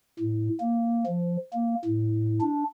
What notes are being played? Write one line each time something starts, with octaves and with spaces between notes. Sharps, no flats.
A2
A#3
F3
A#3
A2
D4